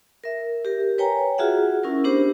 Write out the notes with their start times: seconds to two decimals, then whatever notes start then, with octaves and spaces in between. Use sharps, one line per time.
0.24 A#4 E5
0.65 G4 A#4
0.98 B4 C#5 G5 G#5 A#5
1.38 F4 F#4 G#4 E5 F#5
1.84 C#4 E4 A#4
2.04 B3 D4 G4 C5